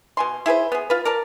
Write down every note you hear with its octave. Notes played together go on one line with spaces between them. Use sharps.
B2 G#5 C6
E4 G#4 B4 C5
B3 G#4
F4 B4
A#4 D5 A5